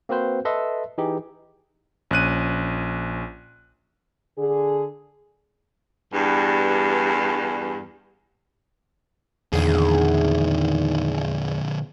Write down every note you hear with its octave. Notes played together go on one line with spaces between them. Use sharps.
A#3 C4 F#4 B4 C5
A4 B4 D#5 E5 C6
E3 D#4 G4 G#4
A#1 C#4 F#6 D#7
D3 G#4
E2 G2
E2 A#2 D3 D#3 G#4